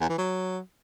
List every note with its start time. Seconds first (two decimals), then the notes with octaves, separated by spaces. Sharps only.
0.01 E2
0.09 E3
0.18 F#3